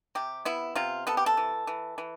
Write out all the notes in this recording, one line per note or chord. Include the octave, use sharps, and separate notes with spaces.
C3 G4
B3 E4
C3 F4
B3 A4
G4
A4
E3
E3
E3